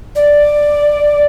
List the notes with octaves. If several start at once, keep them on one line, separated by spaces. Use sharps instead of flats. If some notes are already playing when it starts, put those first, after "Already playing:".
D5